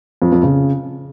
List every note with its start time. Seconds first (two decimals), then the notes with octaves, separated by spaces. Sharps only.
0.22 F2
0.32 F2
0.43 C#3